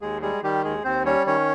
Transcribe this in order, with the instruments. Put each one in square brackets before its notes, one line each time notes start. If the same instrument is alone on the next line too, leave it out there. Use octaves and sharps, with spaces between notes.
[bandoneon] D#2 G#3 G#4
G3 G#3 G#4
D#3 G3 G4
D#2 G#3 G#4
D#2 C4 C5
G3 C#4 C#5
D#3 C#4 C#5